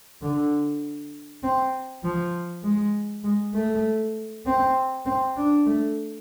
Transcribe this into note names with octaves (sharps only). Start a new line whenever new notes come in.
D3
C4
F3
G#3
G#3
A3
C4
C4
D4
A3